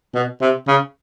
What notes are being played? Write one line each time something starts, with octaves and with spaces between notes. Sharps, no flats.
B2
C3
C#3